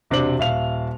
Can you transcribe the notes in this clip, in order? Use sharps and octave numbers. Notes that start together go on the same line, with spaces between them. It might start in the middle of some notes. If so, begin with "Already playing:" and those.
E1 C3 D4 C5 D6 F#7
D#1 E5 F5 F7